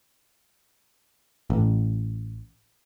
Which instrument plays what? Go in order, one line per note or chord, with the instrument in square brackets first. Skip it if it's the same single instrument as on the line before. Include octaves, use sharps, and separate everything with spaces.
[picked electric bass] A1